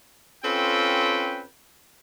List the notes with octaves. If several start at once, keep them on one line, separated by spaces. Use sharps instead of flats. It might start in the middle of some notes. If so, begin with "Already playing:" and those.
C4 C#4 F4 A4 B4 G5